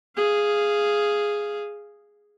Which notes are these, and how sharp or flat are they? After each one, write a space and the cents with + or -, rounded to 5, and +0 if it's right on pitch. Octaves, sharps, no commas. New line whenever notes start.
G#4 +0 F5 -10